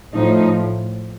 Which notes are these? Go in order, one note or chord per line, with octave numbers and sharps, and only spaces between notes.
A2 F3 D#4